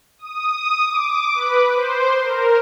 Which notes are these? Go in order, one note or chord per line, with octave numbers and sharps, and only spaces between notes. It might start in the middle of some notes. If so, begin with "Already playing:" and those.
D#6
D6
B4
C5
A#4